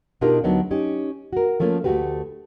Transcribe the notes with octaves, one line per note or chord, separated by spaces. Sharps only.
B2 D4 D#4 F4 G4 A#4
D2 F#3 B3 D4 D#4 C#5
C#4 D#4 G4
F#4 A#4
F3 A3 A#3 C#4 F4
D2 G#2 A3 F#4 G4 B4